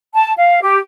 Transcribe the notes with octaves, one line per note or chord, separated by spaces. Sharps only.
A5
F5
G4